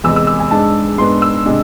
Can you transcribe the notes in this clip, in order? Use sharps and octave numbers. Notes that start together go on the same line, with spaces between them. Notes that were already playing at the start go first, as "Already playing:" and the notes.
E2 C3 G#3 E6
E6
E6
G#5
G#2 G#3 D4 A5
G#2 G#3 B3 D4 C6
E6
C3 G#3 D4